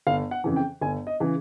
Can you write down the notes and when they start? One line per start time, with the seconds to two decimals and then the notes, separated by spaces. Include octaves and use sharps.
0.07 G1 F5
0.31 F#5
0.44 F2 C#3 E3
0.56 G5
0.81 G1 G#5
1.07 D#5
1.20 C#3 E3